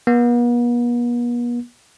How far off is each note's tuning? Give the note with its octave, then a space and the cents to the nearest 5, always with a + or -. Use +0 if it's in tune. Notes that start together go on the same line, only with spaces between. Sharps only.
B3 -45